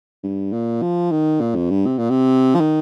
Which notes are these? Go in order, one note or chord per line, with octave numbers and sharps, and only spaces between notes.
G2
A#2
F3
D#3
A#2
F2
G2
C3
A#2
C3
F3
D#3